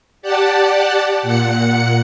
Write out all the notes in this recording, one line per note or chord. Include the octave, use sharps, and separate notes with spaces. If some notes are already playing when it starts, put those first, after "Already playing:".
G4 D5 F#5 A5
A#2 F#5 C#7